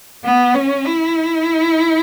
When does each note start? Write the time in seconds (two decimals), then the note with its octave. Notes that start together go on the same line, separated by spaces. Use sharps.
0.25 B3
0.54 C#4
0.85 E4